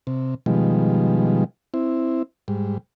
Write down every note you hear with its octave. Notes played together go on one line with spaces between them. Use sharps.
C3
B2 D#3 F3 G3 G#3
C4 E4
G#2 G3